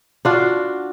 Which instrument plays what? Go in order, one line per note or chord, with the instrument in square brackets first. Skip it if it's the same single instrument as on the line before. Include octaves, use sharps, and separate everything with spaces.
[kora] D4 F4 F#4